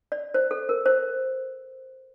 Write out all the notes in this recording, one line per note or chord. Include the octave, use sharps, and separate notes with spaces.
D5
C5
A4
A#4
C5